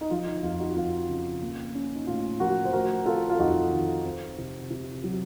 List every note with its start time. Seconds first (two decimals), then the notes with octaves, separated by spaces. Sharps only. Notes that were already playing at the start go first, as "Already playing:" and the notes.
0.01 D#4
0.10 F3 F4
0.27 D#4
0.43 F2 F4
0.59 D#4 F#4
0.76 F2 F4
1.09 C#3
1.42 A#3
1.75 C#4
1.95 D#4
2.07 A2 F4
2.40 F3 F#4 A#4
2.65 C5
2.73 A3 F#4 A#4
3.06 C4 F4 A4
3.30 F4
3.39 F2 D#4 F#4
3.72 D#3
4.05 C4
4.38 C3
4.70 C3
5.04 F#3